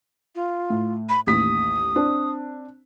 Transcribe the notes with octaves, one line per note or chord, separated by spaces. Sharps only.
F4
A2
B5
A1 D#2 D#6 B6
C4 D4